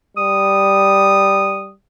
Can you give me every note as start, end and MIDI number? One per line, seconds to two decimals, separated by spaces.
0.17 1.74 55
0.17 1.70 87